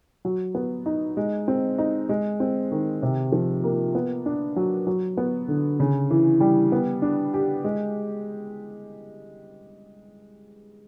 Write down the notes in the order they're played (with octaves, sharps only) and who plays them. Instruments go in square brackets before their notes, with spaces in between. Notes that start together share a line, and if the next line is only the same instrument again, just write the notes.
[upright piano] F#3
B3
D#4
G#3
C4
D#4
G#3
C4
D#3
C3
F3
A#3
B3
D4
F#3
F#3
B3
D3
C#3
E3
G3
B3
D4
G4
G#3